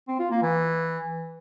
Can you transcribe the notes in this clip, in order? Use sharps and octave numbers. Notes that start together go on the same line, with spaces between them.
C4
F4
A#3
E3